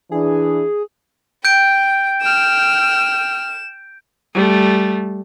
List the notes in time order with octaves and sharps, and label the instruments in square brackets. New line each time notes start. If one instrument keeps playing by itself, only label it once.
[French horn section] E3 D4 [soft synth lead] G#4
[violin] G5 [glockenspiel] G6 D7
[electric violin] G5 F6 [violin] E7
[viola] G3 A3